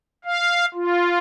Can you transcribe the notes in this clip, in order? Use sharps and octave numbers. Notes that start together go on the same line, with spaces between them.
F5
F4